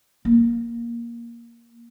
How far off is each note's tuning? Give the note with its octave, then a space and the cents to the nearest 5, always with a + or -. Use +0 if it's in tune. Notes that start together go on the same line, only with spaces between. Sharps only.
A#3 +10